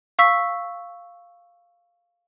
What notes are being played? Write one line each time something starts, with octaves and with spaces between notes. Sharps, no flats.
F5 C#6 E6 B6